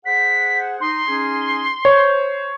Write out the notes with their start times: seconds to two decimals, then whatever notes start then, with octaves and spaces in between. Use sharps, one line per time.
0.05 G#4 C5 F#5 B6
0.81 D#4 C6
1.07 C#4 D#4 G#4
1.85 C5 C#5